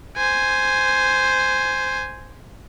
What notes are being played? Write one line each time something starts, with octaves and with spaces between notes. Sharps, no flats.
C5 G#5